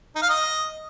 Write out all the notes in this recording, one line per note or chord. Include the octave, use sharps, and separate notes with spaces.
D#4
F5
D#5